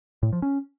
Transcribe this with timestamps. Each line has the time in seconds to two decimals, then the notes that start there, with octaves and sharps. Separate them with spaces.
0.23 A2
0.33 F3
0.42 C#4